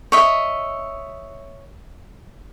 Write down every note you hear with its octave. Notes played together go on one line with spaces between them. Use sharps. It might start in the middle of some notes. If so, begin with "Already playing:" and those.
C#5 D#5 E5